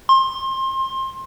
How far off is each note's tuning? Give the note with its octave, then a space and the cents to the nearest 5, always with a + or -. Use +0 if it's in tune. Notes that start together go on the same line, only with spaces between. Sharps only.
C6 +25